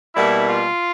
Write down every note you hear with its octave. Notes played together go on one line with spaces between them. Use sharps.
B2 G3 A#3 E4
F4